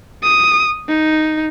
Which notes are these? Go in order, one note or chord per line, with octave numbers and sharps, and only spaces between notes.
D#6
D#4